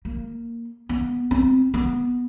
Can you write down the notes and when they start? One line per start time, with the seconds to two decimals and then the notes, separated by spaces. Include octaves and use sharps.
0.05 A#3
0.89 B3
1.31 C4
1.74 B3